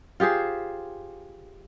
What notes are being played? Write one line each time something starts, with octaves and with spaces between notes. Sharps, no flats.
F4 G4 G#4 C5